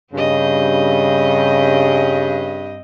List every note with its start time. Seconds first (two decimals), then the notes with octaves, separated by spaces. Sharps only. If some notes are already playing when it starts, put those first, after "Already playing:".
0.13 G2 C#3 C4 D#5